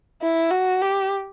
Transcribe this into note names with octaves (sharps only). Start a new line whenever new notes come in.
E4
F#4
G4